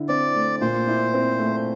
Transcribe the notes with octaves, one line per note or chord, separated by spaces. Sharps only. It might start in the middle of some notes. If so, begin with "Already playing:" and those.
Already playing: D3 E4
C4 D5
A3
A#2 C5
E4
C4
A3